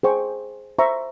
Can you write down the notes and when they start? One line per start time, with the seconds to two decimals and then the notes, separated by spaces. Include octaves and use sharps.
0.03 G#4 C5 G5 C#6
0.79 C5 E5 A#5 C#6